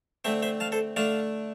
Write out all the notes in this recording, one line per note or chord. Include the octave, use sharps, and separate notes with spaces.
D3 A3 C4 C5 E5
C5 E5
F5 A5
A4 C5
D3 A3 D4 F5 A5